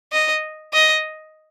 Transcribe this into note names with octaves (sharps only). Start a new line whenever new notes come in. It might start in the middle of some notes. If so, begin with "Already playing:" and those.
D#5
D#5